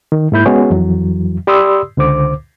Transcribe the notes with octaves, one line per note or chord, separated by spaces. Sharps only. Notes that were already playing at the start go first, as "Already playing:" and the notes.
D#3
G#2 A#3 E4 B5 G6
G#3 B3 C#4 F#4 G#4 C#5
F2 E3 F#3
G4 D5 B5 C6 D#6 E6
C#2 D3 C5 D6